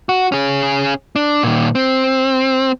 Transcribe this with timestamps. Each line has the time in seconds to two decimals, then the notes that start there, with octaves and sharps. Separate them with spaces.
0.09 F#4
0.32 C#4 G#4
1.16 D4
1.43 A#2 D#3
1.75 C4